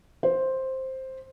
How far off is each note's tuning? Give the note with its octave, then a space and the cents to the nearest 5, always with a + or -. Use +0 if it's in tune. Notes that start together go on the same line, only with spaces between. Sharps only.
C5 +5